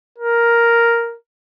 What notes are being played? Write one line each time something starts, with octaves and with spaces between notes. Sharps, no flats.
A#4